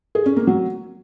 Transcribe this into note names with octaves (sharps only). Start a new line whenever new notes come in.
G#4
C#4
A#3
F#3